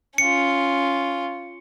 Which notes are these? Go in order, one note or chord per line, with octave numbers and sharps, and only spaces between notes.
C#4 F4 C#7